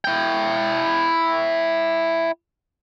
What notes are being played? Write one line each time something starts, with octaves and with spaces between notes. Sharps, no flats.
E4 G5